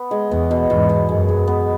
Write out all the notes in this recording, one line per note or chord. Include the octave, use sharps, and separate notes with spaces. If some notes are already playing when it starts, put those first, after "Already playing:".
Already playing: B3
G#3
E2 B3
B2
E2 G#2 B2
B3
F#2 G#3
G#3
B3